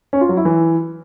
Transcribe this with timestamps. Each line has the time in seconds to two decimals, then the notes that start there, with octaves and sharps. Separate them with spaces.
0.13 C#4
0.21 F4
0.29 F#3
0.37 E4
0.45 E3